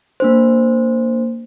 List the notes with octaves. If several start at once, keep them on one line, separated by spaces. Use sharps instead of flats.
A#3 D4 C5